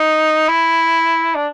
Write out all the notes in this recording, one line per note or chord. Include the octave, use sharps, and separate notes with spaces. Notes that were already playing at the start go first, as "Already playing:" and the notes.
Already playing: D#4
E4
D4